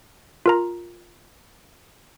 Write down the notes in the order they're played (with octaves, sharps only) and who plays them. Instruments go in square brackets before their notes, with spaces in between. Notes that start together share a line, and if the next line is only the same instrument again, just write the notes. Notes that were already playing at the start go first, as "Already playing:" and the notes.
[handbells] F4 A#4 A#5